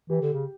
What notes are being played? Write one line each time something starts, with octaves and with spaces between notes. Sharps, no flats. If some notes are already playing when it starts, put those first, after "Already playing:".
E3 G4
D3
C#3